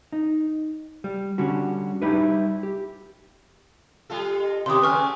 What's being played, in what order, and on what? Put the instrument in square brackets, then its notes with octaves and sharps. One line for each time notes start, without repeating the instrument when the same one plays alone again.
[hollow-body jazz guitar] D#4
G3
D3 G3 C#4 F#4
G3 D#4 E4 G4 B4
G4
[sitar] G3 F4 A4
[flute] D#5
[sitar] B2 D#3 E4 [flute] G4 [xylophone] C6 D#6
[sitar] C#3 F#3 A3 [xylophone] B4 C#6 F6 [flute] G#5